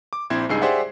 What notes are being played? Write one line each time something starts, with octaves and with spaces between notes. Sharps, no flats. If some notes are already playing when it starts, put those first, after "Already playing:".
D6
A#1 C4 E4 C5 G#6
C#2 G2 D#4 G#4 E6 C7
G4 G#4 C5 D5 E5 F#5